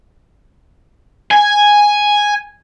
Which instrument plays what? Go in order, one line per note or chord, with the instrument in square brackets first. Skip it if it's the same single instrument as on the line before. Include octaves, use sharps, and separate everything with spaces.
[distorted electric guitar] G#5